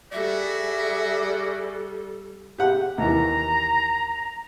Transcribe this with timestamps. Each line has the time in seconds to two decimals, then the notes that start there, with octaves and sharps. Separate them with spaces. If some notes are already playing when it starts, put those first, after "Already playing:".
0.12 G3 F#4 G#4 A4 D5 E5
2.58 G4 F#5
2.98 D#2 E3 A#5